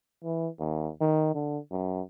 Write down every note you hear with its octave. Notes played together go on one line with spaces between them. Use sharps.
E3
D#2
D#3
D3
F#2